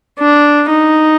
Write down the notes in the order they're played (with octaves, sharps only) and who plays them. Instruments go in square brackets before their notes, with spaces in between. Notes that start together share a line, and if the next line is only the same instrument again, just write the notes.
[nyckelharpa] D4
D#4